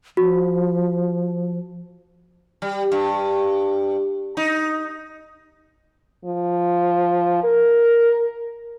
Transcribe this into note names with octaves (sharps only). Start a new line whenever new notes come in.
F3 F#4
G3
G2
D#4
F3
A#4